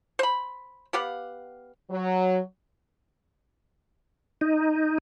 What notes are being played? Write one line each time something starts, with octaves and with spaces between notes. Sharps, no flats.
C5 B5
B3 G4 F5 F#5
F#3
D#4